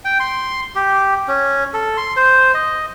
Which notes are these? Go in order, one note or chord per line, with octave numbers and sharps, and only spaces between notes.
G5
C6
G4
C#4
A4
C6
C5
D#5